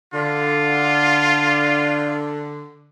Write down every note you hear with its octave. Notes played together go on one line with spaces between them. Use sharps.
D3 F4